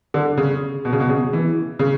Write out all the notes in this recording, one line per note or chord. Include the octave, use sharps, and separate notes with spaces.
D3
C#3
B2
C#3
B2
C#3
E3
C#3